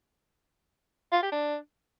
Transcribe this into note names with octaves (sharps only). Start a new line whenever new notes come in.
F4
G4
D4